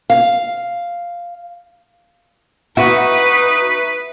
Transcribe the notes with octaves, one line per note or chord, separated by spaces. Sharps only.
F5
D#4 F#4 B4 E5 C#6